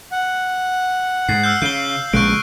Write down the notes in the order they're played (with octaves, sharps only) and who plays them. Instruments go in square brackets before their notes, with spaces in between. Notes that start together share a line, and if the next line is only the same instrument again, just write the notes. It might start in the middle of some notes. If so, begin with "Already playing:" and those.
[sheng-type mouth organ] F#5
[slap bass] G#2 [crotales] C7
[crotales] E6 F6 G6
[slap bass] C#3 [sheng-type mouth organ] F5 [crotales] G6 G7
[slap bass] A#1 C#3 G#3 [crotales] C#6 F#6 D7